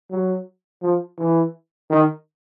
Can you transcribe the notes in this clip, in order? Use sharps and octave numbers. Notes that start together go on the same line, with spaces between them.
F#3
F3
E3
D#3